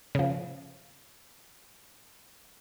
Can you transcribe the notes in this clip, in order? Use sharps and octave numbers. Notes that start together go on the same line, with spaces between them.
C#3 F3